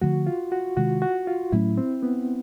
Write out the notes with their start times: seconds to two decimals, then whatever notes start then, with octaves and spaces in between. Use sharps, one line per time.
0.01 D3 F3 A3 F#4
0.27 F4
0.52 F#4
0.77 C3 D#3 G#3 F#4
1.02 F#4
1.27 F4
1.52 A2 F#3 A3 C#4 E4
1.77 C4
2.03 B3